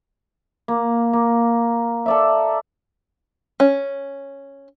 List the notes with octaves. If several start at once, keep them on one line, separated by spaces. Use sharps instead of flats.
A#3
A#3
A4 D5 E5
C#4